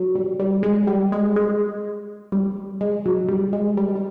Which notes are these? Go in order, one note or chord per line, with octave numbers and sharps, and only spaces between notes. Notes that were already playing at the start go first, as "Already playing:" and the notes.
Already playing: F#3
G3
G3
G#3
G3
G#3
G#3
G3
G#3
F#3
G3
G#3
G3
G3